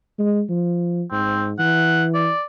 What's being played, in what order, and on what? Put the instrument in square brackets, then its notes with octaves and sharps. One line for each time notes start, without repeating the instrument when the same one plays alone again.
[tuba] G#3
F3
[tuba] G#2 [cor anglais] C4
[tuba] E3 [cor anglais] F#5
[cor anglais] D5